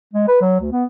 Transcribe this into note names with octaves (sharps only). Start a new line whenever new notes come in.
G#3
B4
F#3
D2
B3